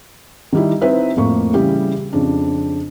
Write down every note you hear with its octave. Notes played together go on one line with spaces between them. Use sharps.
D#3 G3 E4
C4 D#4 E4 B4 E5
F2 A2 A#3 C#6
C#3 E3 G3 E4 G4 G#4
F2 C#3 D4